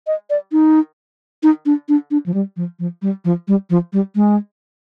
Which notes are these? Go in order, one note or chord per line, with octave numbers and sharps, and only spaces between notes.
D#5
D5
D#4
D#4
D4
D4
D4
F3
G3
F3
F3
G3
F3
G3
F3
G3
G#3